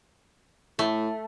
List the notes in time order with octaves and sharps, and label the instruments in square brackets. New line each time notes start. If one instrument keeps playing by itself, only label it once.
[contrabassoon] A2 [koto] A3